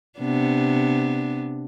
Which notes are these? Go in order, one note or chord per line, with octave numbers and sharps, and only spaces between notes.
C3 B3 D4